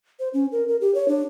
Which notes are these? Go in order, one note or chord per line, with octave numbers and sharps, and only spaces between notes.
C5
C#4
A#4
A#4
G4
C#5
D4